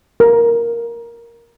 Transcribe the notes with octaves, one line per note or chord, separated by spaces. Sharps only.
A#4